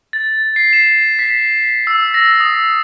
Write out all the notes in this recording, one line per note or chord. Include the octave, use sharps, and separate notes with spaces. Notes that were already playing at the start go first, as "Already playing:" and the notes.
A6
C7
E7
B6
E6
A#6
D#6